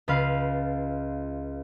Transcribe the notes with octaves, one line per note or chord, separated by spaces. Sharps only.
C#2 F4 B4 F5